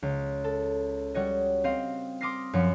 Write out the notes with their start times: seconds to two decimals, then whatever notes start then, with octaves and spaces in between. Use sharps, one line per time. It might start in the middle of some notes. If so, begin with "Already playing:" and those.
0.02 C#2
0.44 A4
1.14 G3 F#4 C#5 D#5
1.64 C4 D#5 F5
2.21 C6 D6 D#6 F6 A#6 C7
2.53 F#2 F3 C#7